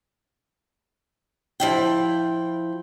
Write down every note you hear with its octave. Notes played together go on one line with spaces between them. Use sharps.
F3 E4 G5